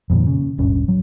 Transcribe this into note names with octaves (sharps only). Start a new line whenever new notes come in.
F2 A#2 D#3
C#3
D#1 G#1 G2 C#4
F#3